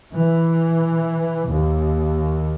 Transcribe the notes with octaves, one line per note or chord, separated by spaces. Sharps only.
E3
D#2